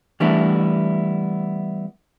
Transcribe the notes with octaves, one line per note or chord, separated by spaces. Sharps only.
E3 G3 A3 B3 D4 E4